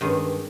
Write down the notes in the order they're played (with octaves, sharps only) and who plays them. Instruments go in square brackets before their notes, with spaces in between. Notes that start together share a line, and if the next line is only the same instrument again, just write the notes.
[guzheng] G2 D#3 G#3 C#4